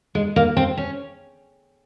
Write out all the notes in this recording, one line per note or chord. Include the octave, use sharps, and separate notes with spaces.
G#3
A#3
C4
C#4